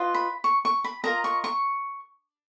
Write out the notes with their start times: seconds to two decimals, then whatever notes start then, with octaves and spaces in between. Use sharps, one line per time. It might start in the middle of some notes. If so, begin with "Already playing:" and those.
Already playing: F4 B4 D#5
0.14 B5
0.44 C#6
0.65 C#6
0.84 B5
1.04 F4 A#4 D#5 A#5
1.24 C#6
1.44 C#6